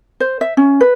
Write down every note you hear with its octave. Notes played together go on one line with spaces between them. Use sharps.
C5
E5
C#4
B4